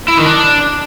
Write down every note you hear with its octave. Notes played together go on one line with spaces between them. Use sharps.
E4
D#3
D4